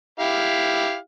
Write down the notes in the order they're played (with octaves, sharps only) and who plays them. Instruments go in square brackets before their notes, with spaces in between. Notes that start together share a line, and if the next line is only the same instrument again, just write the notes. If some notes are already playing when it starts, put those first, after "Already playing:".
[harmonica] E4 G4 F5